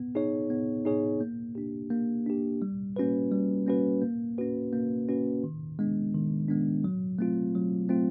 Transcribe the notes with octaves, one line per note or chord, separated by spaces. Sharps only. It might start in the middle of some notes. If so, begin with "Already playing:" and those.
Already playing: B3
D#4 G#4 C#5
B3
D#4 G#4 C#5
A#3
D4 G4
A#3
D4 G4
G3
A#3 C#4 F#4 B4
G3
A#3 C#4 F#4 B4
A#3
C#4 F#4 B4
A#3
C#4 F#4 B4
D#3
G#3 B3 D4
D#3
G#3 B3 D4
F#3
A3 C4 F4
F#3
A3 C4 F4